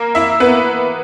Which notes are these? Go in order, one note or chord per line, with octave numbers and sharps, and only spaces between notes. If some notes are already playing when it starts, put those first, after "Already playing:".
Already playing: A#3 A#4
E4 E5
B3 B4